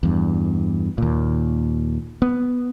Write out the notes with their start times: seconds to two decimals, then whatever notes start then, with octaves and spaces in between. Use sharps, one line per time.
0.03 E2 G2
0.98 D#2 A#2
2.22 B3